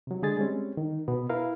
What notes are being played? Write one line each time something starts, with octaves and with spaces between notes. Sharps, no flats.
C3 F#3
D3 G#3 G#4 G#5 A6
G3 G#3 C4 C#4
D#3
B2 B3
E4 A#4 B4 F5